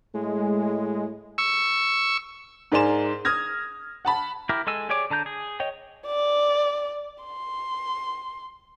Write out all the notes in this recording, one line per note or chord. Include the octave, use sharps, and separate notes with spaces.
A2 G#3
C#6 E6
G#2 G#4 A#4 D5 C6 E7
D#6 F6 G#6 A#6
F#5 A5 B5
E4 G4 A#4
G#3 A4 G#5 E6
G4 G#4 C#5 D5 D6
D3 A5 A#5 G6
G#4
C#5 D#5 G5
D5
C6